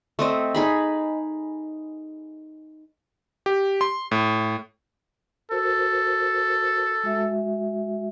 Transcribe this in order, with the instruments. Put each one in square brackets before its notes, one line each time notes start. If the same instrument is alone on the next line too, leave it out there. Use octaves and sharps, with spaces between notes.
[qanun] A3 C4 D#5
D#4 G#4 B5
[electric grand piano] G4
C6
A2
[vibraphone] F#4 A#4 C5 [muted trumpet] A4
[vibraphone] G#3 F#4 E5